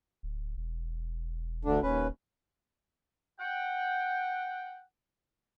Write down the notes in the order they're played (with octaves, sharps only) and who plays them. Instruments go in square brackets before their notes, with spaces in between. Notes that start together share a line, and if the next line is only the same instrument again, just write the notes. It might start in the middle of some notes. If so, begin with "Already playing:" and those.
[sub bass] D1
E1
[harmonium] D2 D3 D4
[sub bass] D#1 [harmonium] D#2 C#4 B4
[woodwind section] F#5 G5